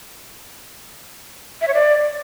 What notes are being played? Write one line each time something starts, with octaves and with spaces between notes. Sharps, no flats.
E5
C#5
D5